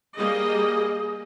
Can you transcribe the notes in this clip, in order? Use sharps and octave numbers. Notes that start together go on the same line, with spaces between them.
G3 A#3 G#4 D#5